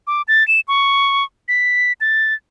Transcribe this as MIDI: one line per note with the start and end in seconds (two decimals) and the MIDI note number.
0.07 0.22 86
0.28 0.46 93
0.48 0.60 100
0.68 1.24 85
1.48 1.93 95
2.01 2.34 93